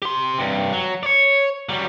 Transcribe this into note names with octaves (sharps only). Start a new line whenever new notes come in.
G4 C6
G2 C3
F#3
C#5 D5
F#3 G3